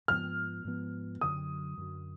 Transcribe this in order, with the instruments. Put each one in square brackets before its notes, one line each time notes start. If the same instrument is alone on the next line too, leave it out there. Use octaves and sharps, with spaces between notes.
[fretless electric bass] G#2 F3 B3 [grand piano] F6
[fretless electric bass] G#2 F3 B3
[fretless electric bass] F#2 D3 F#3 [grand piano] D#6
[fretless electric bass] F#2 D3 F#3